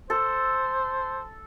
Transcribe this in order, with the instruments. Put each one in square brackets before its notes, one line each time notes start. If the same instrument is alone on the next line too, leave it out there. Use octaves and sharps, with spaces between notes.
[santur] A4 [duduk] C5